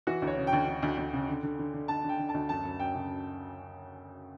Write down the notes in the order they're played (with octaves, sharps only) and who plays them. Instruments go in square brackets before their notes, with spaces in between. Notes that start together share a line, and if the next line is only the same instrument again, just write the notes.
[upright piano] E3 F#4
D2
C#5
C#3
G5
D2
D2
D2
D2
C#3
D3
D3
D3
D3
D3 A5
D3
G5
D3
A5
D2
F#2 A5
F#2
F#2 G5
C#3